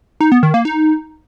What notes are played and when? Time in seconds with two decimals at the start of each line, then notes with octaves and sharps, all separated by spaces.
0.21 D#4
0.32 B3
0.43 D#3
0.54 A#3
0.65 D#4